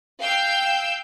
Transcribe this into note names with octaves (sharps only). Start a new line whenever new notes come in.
F5 G5 E6 G6